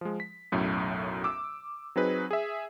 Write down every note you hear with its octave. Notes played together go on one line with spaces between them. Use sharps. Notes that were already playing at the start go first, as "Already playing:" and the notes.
F3 G#3
B6
B1 F#2 A2
D6 E6
F#3 C4 D#4 G#4 B4
G#4 E5